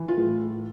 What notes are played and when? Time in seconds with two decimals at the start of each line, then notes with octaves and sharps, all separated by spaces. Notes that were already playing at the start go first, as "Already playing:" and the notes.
Already playing: E3
0.08 F4
0.17 A2